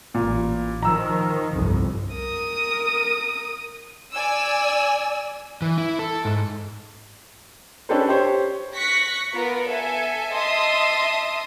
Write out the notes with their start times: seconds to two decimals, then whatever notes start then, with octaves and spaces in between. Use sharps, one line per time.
0.14 A1 A#2
0.83 D#3 F3 A#5 E6
1.53 G1 C2 F2
2.14 A#4 D#6
4.14 D5 G#5 E6
5.62 E3
5.78 E4
5.99 A4
6.25 G#2
7.89 C#4 D4 G4 A4 B4 C5
8.09 G4 C5 C#5
8.75 C#6 F#6 A#6 B6 C#7
9.34 B3 F4 A#4 B4
9.68 A4 E5 G#5
10.33 D#5 E5 A5 C6 D#6